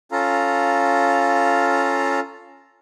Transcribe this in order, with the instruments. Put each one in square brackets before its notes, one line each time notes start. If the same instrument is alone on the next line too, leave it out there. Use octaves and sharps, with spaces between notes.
[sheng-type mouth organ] C#4 F4 A4 F5 A#5